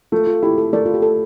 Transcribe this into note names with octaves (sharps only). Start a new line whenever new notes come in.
A3 F4
F4
E4 G4
A4
A3 A#4 D5
F4
G4
A4